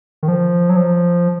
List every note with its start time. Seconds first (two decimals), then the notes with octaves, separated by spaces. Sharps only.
0.23 D#3
0.28 F3
0.69 F#3
0.76 F3